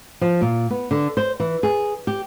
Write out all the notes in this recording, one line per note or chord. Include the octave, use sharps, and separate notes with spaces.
F3
A#2
B3
D3
C5
E3
G#4
G4